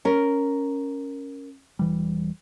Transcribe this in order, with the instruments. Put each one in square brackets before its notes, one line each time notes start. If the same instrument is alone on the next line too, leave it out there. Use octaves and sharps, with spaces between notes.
[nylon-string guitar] C#4 A#4
[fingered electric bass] E1 E3 G3